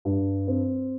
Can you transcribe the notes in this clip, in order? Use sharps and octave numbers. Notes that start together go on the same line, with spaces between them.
G2
C4